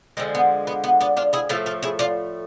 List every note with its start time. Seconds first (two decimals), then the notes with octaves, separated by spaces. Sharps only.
0.17 D3 F3 G#3 A3 C4
0.35 B3
0.67 B3
0.84 B3
1.01 B3 D4
1.17 D4 F4
1.33 E4 G#4
1.49 A2 F3 A3 F4 A4
1.66 F4 A4
1.83 E4 G#4
1.99 D4 F4